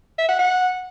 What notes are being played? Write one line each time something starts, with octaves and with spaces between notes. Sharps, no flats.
E5
F#5
F#5